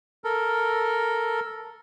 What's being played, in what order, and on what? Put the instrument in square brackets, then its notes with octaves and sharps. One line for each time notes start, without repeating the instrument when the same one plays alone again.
[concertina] A4 A#4